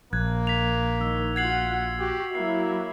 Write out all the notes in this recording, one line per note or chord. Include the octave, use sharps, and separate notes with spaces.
A#1 A#3 F#6 G#6
B6 F7
D#3 E6
F4 F#4 F#5 G#6 C7 F#7
F#4 G4
F#3 A#3 E4 E5 C7